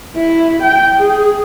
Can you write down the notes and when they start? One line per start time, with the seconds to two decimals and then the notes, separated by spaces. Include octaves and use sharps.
0.16 E4
0.62 G5
1.00 G#4